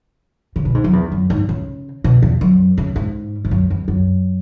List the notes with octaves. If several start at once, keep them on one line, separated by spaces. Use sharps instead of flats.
C#3
B2
G#2
F#2
E2
F#2
G#2
C#3
B2
E2
F#2
C#3
G#2
G#2
F#2
E2
F#2